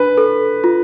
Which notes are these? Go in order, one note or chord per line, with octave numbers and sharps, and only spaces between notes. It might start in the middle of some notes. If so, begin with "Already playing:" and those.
Already playing: D4 B4
A4
F4